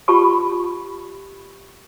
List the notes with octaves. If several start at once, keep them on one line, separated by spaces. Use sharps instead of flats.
F4 G4 A5 B5 C#6